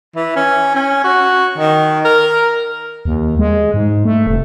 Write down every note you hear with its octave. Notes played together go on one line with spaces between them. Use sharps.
E3
C#4
C#4
F#4
D#3
A#4
D#2
G#3
G#2
A3
F1